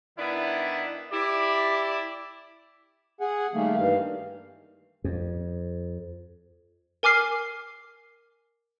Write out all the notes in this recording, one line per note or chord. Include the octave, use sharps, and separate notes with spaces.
D#3 B3 D4 E4
E4 G4 D5
G#4 F#5 G#5
D#3 G3 A3 A#3
G2 D#3 E3 G3 F5
F2
A#4 G#5 D6 F6 C7